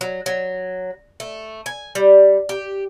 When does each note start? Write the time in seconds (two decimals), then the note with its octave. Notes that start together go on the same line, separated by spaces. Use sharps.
0.01 F#3
0.26 F#3
1.20 A3
1.66 G#5
1.95 G3
2.49 G4